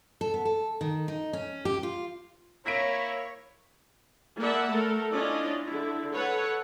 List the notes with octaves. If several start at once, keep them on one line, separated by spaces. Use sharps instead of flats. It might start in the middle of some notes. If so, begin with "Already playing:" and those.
A4
B3
A4
D#3
D#4
C#4
G4
F4
A#3 E4 C#5 A#6 B6 D7
A#3 D5 E5 F#5 A5 B5
A3 A4 A#4
C#4 D4 E4 F4 D5 D#5
D3 E4
A4 B4 C#5 F#5